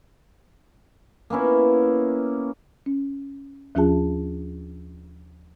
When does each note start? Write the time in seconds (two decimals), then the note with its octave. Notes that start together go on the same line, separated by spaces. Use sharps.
1.30 A#3 B3 C#4 E4
2.86 C#4
3.75 D#2 F3 C#4 F4 G#4 A5